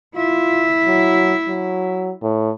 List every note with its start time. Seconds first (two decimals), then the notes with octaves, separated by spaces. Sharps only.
0.15 E4 F4 E5
0.87 F#3
1.48 F#3
2.22 A2